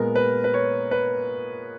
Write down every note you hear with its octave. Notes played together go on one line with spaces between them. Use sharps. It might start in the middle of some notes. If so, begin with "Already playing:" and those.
Already playing: A#2 G#3 B3 A#4
B4
B4
C#5
B4